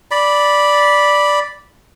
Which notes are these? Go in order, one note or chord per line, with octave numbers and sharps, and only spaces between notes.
D5 B5